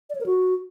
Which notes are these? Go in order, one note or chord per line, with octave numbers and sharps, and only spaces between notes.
D5
C#5
A#4
F#4